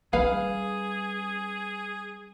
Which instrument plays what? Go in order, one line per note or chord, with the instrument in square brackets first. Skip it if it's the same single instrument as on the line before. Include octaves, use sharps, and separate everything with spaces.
[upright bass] G3 C#4 [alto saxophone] G#4 [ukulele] B4 F5